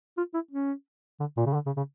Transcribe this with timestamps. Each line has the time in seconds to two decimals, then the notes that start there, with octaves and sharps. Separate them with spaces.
0.17 F4
0.34 E4
0.51 C#4
1.20 D3
1.37 A#2
1.46 C#3
1.54 D3
1.66 C#3
1.77 C#3